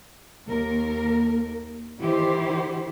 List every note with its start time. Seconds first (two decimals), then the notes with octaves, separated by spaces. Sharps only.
0.46 D#2 A#3 A#4
2.00 D#3 E3 E4 G4 C5